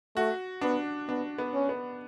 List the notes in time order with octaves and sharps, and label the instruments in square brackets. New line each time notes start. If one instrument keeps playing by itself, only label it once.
[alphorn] A3 [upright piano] F#4
[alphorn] B3 [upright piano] D4
[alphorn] B3 [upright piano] D4
[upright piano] B3
[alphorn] C#4
[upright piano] B3